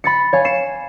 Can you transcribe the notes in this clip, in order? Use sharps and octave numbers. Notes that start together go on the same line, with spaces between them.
B5 A6 C#7
C#5 F5 G#5
C7 C#7 E7